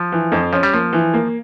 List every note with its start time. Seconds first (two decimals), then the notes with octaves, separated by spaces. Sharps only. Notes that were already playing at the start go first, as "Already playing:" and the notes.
Already playing: F3
0.12 E3
0.32 F2
0.53 F3 C#4
0.63 G3
0.73 F3 A#3
0.93 E3
1.14 A#3